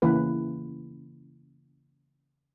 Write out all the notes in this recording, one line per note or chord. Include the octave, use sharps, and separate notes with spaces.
C#3 E3 A#3 B4